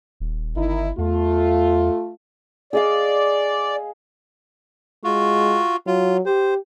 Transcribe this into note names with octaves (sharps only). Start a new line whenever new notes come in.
D#1
G1 D#3 D#4 E4
E2 A3 F4
G#4 D5 D#5 F5
G#3 F4 F#4
F#3 F4
G4 C5